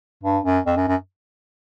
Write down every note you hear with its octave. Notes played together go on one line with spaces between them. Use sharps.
G2
F#2
F2
F#2
F#2